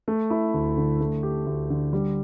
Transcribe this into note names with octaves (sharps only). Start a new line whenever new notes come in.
A3
E4
D2
D3
A3
G4
D2
D3
G3